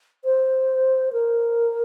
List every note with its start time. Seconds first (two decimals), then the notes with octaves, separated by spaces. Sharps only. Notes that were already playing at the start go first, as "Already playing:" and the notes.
0.25 C5
1.13 A#4